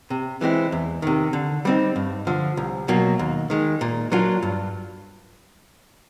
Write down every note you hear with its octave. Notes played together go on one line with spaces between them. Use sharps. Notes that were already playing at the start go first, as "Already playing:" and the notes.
C3
E3 G#3 C4 E4
E2
C3 D#3
D3
G3 C4 D#4
G2
D3 F3
C2
B2 F#3 A#3
D#2
D#3 G#3
A#2
F#3 A#3 D4 F4
G2